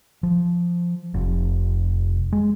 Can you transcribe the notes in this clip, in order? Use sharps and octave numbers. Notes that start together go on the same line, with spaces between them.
F3
F1
G#3